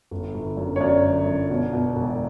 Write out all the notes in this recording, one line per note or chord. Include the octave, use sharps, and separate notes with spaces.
G1
G1
F#2
C#5
F#2 D5
G1
F#2
B2
B2
E1